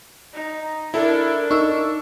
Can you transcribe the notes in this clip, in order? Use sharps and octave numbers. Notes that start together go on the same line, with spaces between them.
D#4
D4 E4 A4 A#4
D#4 C#6 E6